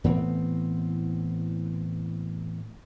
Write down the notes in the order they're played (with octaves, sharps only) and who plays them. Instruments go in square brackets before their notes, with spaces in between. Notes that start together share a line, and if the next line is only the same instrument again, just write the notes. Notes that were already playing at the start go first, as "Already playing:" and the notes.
[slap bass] A2 E3 B3 C4